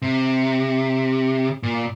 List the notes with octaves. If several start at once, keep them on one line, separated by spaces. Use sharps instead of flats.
C3
A#2